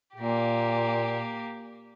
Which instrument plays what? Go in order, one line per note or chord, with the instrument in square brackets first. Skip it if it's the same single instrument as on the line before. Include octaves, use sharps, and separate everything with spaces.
[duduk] A#2 [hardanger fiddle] A#3 G4